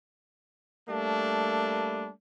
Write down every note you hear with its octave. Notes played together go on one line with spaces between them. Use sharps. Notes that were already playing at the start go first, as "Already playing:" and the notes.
G3 A3 A#3 D4